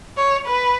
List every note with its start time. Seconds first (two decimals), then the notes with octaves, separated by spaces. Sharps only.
0.17 C#5
0.46 B4